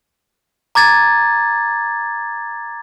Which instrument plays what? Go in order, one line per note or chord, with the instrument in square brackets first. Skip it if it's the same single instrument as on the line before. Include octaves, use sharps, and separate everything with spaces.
[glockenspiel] A#5 D6 G#6 A6